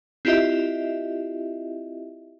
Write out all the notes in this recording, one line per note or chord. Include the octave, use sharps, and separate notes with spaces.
C4 E4 F4 G4 D#5 E5